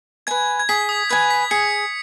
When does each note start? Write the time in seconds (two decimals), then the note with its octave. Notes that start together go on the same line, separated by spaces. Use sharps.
0.27 B4 G#5 G#6
0.59 G#6
0.69 G#4 B6
0.89 D#6
1.10 B4 G#5 G#6
1.30 B6
1.51 G#4 C#7